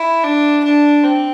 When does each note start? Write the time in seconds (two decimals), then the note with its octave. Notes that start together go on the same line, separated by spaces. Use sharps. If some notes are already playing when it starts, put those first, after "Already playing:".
Already playing: E4
0.23 D4
0.64 D4
1.04 C4